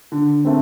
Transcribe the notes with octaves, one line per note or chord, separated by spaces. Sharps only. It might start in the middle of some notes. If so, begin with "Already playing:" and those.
D3
A3 C4